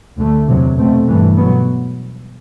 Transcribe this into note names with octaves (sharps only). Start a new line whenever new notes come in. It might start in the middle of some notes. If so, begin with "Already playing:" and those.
D2 D3 A3
E2 C3 F#3
B2 A3 C4
G2 E3 A3
B2 F#3 B3